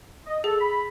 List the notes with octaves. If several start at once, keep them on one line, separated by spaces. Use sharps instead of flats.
D#5
G#4 A4
B5